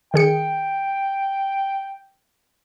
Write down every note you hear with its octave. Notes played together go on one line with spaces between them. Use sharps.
D#3 G#4 G5 C#7